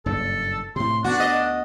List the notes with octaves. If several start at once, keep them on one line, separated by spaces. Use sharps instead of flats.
F#1 G2 A#2 A4
A2 C3 C6
D2 B3 D4 F#4
D#5